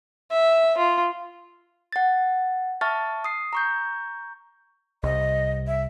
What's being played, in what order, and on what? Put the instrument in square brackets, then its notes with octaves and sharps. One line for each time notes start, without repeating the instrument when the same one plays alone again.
[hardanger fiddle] E5
F4
[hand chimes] F#5 A6
E5 A5 C#6 F6 A6
D#6 C7
A#5 C#6 G6
[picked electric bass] C2 [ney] D#5
[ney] E5